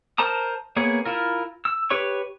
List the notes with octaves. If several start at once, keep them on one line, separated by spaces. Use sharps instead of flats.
A#4 C5 A5 A#5 D#6
A#3 B3 G#4 C#5
E4 F4 A#4
E6
G4 B4 C#5 C#6